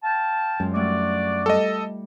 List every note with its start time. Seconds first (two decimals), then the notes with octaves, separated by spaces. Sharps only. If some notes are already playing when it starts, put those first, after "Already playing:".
0.03 F5 G5 A5
0.60 F#2 G#3 F4
0.74 G3 A3 D4 D#4 F#4 D5
1.46 G3 A4 D#5